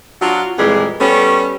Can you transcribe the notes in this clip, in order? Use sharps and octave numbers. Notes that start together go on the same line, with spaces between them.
F#3 D4 F4 F#4
F2 A#2 E3 G3 G#3 G#4
G3 A3 B3 C#4